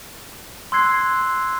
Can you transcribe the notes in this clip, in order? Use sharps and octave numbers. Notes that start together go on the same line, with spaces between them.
C6 E6 F#6 G#6 C7